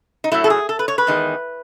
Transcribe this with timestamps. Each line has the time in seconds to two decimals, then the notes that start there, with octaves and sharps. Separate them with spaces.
0.24 D#4
0.32 A2 F#3 A3 E4
0.44 A4
0.50 G#4
0.69 A4
0.79 B4
0.88 C#5
0.98 B4
1.07 E2 D#3 G#3